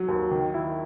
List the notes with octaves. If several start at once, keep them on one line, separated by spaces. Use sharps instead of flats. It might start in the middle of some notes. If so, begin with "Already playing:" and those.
Already playing: F#3
D#2
D#3
E4